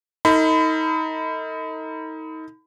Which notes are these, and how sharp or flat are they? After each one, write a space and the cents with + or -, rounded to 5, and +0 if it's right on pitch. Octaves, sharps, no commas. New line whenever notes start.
D#4 +30 A4 +45 B5 +35